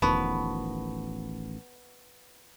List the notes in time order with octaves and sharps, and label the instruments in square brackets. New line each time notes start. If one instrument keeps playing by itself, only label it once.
[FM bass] E1 [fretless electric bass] A1 D#3 F3 [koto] B3 [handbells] A5 B5 C#6